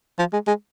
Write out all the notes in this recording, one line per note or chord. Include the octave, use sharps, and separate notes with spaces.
F3
G#3
G#3